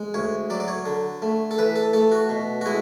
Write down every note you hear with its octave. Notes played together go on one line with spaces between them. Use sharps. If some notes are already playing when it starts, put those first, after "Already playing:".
Already playing: G#3
D2 C#5
F#3 D5
D5
C#5
D3
A3
A4
E3 B4
A4
A3 A4
F#4
B2
F#4
G#3 E4